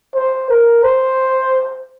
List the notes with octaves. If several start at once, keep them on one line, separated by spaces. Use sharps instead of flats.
C5
A#4
C5